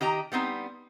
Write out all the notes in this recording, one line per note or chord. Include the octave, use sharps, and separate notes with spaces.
D#3 G4 D#5 A#5
G3 B3 C4 D#4